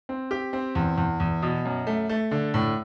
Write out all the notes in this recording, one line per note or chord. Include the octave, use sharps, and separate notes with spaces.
C4
G4
C4
E2
E2
E2
B2
F#2
A3
A3
D3
A2